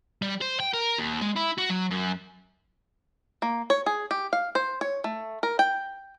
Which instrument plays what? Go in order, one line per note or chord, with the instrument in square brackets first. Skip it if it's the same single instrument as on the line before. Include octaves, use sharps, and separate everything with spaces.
[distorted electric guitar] G3
C5
G5
A#4
D#2
G#3
E4
F#4
F#3
F#2
[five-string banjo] A#3
C#5
G#4
G4
F5
C5
C#5
A3
A#4
G5